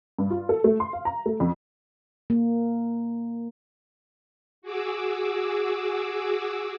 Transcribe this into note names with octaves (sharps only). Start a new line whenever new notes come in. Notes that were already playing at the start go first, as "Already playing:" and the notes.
G2
F4
A4
A3
C6
F5
A#5
A3
F2
A#3
F#4 G#4 D6 E6